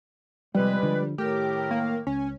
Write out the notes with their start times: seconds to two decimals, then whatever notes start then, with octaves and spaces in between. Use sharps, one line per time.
0.55 C3 F3 G3 G#3 B4
0.83 D3 F3
1.18 A2 D#3 A3 G4 A#4
1.71 A#3
2.07 C#2 C#4